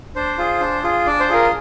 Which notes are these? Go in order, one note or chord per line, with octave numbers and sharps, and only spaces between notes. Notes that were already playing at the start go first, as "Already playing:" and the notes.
D4 C5
F4 G#4
D4
F4 G#4
D4 D5
C5
F4 G#4 A#4